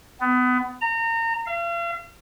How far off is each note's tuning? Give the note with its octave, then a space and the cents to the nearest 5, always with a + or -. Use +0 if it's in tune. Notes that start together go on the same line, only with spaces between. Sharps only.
B3 +25
A#5 -30
F5 -40